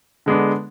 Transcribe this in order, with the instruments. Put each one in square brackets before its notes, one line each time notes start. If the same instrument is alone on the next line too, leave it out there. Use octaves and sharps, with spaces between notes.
[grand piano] D3 G#3 B3 D4